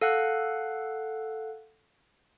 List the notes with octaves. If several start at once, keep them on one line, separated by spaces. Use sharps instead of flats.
A4 F5 F#5 F#6